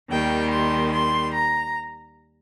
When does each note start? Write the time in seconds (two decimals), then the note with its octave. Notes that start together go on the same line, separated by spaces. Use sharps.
0.11 D#2 D#3 G3 G5
0.52 C6
0.95 C6
1.35 A#5